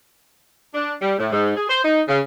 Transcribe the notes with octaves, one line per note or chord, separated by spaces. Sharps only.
D4
G3
A2
G#2
G#4
C5
D#4
C#3